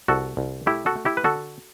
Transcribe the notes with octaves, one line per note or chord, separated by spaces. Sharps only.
C2 F#4 A4
C2
A3 E4 G4
F#4 A4
A3
E4 G4
B4
D3 F#4 A4